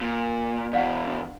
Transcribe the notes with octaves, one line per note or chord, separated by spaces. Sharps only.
A#2
E2 B2 D5 F5 F#5
D4